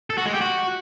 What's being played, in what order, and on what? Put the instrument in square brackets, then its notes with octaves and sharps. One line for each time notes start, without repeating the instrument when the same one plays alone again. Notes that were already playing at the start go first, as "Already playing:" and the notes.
[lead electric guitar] A4
F#4
G#3
G4
F#4